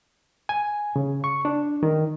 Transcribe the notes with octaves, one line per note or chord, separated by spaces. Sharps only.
G#5
C#3
C#6
D4
D#3